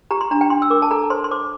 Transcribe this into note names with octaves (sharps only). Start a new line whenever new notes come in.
G4 A#5
C6
D4 A#5
G5
D4 C6
E6
A#4 D6
A5
A4 A#5
C5 C6
C6
C5 D6